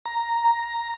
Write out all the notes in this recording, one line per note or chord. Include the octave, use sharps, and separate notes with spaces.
A#5